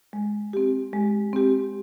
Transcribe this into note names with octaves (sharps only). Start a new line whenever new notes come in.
G#3
C4 G4
G#3
C4 G4